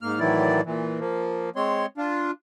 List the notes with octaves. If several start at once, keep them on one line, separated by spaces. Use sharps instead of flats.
G#2 A#3 F6
A2 D#3 E3 F#3 E4 D5
A#2 E3
F3 A#3
G#3 C4 C#5 C6
D4 F4